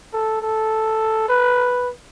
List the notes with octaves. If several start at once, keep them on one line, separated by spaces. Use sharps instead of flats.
A4
A4
B4